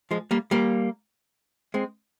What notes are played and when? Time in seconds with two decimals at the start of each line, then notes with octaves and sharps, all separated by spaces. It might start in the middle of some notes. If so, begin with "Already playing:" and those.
0.11 F3 G#3
0.31 G3 A#3
0.51 G3 A#3
1.74 G#3 C4